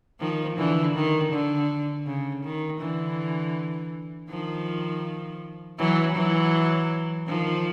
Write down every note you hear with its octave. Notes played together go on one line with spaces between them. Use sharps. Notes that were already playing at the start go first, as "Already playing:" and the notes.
D#3 F3
D3 E3
D#3
D3
C#3
D#3
D3 E3
D#3 F3
E3 F#3
E3 F#3
D#3 F3